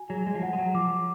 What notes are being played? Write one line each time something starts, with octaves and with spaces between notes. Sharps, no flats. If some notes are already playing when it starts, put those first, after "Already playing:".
Already playing: F#4 G#5
F#3 G#4
G#3
F3
F#3 F#5
G#3
F#3
F3 D6